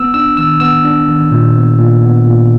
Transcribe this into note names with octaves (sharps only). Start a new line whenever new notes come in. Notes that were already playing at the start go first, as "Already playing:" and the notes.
Already playing: B3 E6
D4 E6
D#3 E6
B3 E6
D4
D#3
A#2
B3
A#2
B3
A#2